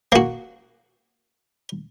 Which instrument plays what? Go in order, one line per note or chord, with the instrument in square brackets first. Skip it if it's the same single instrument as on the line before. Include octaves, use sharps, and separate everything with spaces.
[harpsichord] A#3 F#4